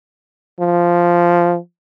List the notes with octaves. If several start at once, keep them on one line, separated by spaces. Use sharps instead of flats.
F3